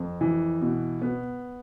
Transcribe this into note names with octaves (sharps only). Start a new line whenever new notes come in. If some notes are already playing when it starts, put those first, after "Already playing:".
Already playing: F2
E3
B2
B3